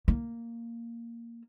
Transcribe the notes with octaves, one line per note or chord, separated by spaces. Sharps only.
A#3